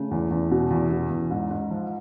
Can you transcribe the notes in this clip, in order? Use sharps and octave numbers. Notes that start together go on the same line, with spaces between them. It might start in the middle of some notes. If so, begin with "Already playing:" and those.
Already playing: C#3 A3
E2
E2
B2
E2
B2
E2
G#2
G#2
F3